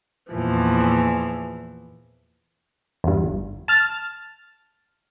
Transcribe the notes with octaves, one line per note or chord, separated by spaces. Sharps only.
E2 A#2 E3 F3
E2 G2
G1
A5 F6 A6